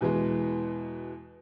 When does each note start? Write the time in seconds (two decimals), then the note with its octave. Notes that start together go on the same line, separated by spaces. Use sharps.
0.01 E2 B2 E3 G#3 B3